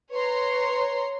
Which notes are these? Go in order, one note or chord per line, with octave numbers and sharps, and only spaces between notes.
B4 C#5 A#5 C6